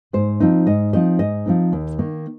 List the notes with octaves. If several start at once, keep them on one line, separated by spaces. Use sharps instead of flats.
G#2 C5
F3 C4 D#4
G#2 D#5
F3 C4 D#4 D#5
G#2 D#5
F3 C4 D#4
D#2
D#3 A#3 D#4